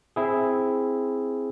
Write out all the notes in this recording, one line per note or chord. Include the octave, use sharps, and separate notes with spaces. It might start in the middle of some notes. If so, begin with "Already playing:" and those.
C4 E4 G#4